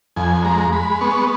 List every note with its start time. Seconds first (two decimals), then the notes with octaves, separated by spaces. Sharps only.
0.16 F2 G#5
0.45 G#3 A#5
0.73 G#3 B5
1.01 B3 C#6